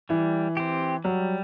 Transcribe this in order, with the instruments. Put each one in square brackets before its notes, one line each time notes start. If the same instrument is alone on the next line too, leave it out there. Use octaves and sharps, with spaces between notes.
[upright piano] E3 [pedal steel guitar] G3
[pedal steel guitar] C4 G4
[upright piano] F#3 [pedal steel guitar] G3